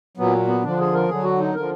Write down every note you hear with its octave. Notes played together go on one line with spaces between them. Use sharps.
A#2 F#3 B3
B3
D3 F3 D4
G#4
A#4
D3 F#3 G#4
F#4
D#4
D3 F3 A#4